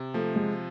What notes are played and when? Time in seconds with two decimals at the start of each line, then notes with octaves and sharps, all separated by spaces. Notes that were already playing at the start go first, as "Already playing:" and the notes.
Already playing: C3
0.14 F3 A3
0.36 G#3